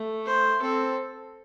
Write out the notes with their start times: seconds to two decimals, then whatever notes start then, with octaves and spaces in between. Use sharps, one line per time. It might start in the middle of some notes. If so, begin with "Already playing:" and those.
Already playing: A3
0.26 C5
0.62 C4 A4